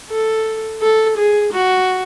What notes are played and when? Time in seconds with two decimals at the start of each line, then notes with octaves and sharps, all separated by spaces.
0.10 A4
0.82 A4
1.17 G#4
1.53 F#4